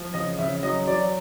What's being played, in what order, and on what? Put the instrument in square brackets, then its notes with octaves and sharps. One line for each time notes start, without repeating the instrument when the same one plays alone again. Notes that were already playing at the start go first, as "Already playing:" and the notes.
Already playing: [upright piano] F3
C#3 D#5
C#3 E5
F#3 D#5
F#3 D5